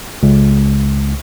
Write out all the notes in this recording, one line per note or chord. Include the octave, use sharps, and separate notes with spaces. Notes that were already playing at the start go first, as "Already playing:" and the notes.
C#2